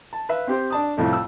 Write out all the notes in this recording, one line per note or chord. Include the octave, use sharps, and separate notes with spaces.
A5
B4 E5 F5
C4 G4 C5
D4 A5 D#6
C2 F2 A2 A3
E6